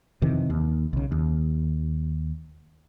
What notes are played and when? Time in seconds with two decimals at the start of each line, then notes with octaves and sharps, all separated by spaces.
0.22 F2 C3 D#3 E3
0.50 D#2
0.93 B1 C#3
1.12 D#2